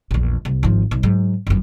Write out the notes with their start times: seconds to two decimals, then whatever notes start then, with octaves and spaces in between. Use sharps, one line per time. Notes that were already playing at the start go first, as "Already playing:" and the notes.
0.11 A#1 E2
0.45 C2
0.63 G#1 F3
0.91 B1
1.03 G#2 F#3
1.47 G1 F#2